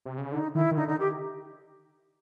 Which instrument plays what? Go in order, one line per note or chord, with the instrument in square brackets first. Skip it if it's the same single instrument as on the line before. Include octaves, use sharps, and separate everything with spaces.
[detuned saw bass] C3
C#3
[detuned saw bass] D3 [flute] D#4
[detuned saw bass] D#3 [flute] E4
[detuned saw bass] D#3
[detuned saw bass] D3 [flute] D#4
[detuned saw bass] D3 [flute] D#4
[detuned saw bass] D#3 [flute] G4